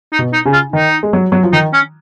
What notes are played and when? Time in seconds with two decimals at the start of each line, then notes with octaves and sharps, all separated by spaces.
0.12 D#4
0.19 B2
0.33 D#4
0.46 C#3
0.53 F4
0.72 D#3 D#4
1.03 G#3
1.13 F#3
1.32 F#3
1.43 F3
1.53 D#3 D#4
1.73 C#4